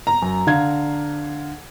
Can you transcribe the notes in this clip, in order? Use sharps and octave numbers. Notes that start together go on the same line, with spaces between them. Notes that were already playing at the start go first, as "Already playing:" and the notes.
A#5
F#2
D3 F5 G#6